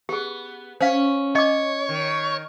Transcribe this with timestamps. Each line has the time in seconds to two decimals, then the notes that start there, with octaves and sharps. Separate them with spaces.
0.09 B3 G4 G#4
0.81 C#4 C5 F5
1.35 C#5 D#5 D6
1.89 D#3